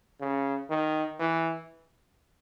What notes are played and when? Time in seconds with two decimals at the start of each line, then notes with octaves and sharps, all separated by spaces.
0.21 C#3
0.70 D#3
1.19 E3